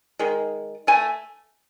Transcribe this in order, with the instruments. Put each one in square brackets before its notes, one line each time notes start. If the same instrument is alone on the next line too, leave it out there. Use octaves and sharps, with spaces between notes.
[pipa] D#3 G#3
A3 G#5